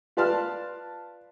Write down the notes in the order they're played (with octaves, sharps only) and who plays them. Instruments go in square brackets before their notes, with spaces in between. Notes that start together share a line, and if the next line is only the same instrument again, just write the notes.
[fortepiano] F4 B4 D5 A5 C6 F6